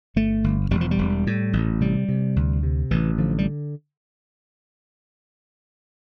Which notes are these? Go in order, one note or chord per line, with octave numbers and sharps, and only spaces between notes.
G1 A3
G1
E1 G3
F3
G3
E1
A2
A1
C3 G3
C3
D2
C3
A1 E3
D3 F3
G3